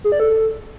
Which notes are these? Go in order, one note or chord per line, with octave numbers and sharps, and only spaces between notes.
G#4
D5
A4